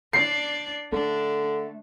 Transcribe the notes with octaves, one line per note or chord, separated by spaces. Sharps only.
D4 D5 C7
D3 A3 D4